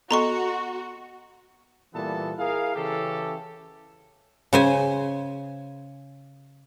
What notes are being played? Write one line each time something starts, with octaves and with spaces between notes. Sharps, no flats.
B3 F#4 A4 D#5 A#5 C6 C#6
A#2 E3 G3 B3 A4 A5
E4 G#4 A#4 F5
C#3 E3 C#4 G4 A4
C#3 C5 G#5